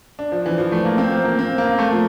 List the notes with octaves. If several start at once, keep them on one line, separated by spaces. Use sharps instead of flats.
D4
F3
E3
F3
A3
A#3
C4
A#3
A#3
C4
A#3
A3
F3